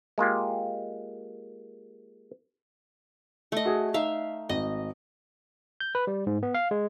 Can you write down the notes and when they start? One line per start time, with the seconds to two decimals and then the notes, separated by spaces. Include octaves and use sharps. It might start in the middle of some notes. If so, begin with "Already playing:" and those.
0.18 G#3 A#3 F4 G4
3.52 A3 D#5
3.65 F#4 G#4
3.94 D#4 E5 F5
4.49 G#1 D#5
5.80 G6
5.95 B4
6.07 G3
6.27 G#2
6.43 B3
6.54 F5
6.71 G#3